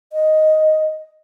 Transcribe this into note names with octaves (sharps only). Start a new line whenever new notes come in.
D#5